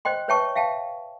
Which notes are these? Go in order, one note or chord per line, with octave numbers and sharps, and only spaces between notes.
C5 D#5 G5 C6
B4 C#5 E5 G5 A5 C#6
E5 F5 G5 A5